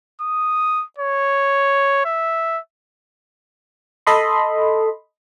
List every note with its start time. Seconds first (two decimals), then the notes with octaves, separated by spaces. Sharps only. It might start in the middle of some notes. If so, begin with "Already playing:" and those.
0.21 D#6
0.98 C#5
2.05 E5
4.07 A4 D#5 B5 C6